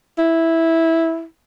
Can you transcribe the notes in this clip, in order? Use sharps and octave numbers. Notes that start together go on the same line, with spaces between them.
E4